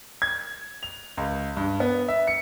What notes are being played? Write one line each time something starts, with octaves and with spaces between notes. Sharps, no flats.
G#6
F7
C#2
G2
B3
E5
C#7